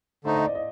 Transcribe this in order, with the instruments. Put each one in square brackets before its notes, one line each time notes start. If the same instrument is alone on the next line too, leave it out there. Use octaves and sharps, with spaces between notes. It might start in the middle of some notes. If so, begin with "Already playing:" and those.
[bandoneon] D3 A3 D#4 [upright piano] C5
[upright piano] D#5
D5
D#5